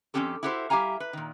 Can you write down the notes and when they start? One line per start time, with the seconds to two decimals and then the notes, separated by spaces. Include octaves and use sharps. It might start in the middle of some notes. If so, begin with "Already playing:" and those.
0.14 F2 F3 C4 C#4 G4 A4
0.43 E4 F#4 G4 A4 B4 C5
0.70 G3 G4 E5 F5 G#5 A#5
1.00 B4
1.13 A#2 D#3